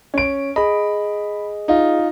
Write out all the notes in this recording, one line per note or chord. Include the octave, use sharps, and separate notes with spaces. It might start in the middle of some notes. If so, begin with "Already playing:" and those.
C#4 D7
G#4 D#5 B5
D#4 F4